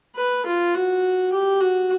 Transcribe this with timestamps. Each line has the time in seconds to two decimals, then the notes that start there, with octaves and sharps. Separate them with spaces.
0.16 B4
0.46 F4
0.75 F#4
1.32 G4
1.61 F#4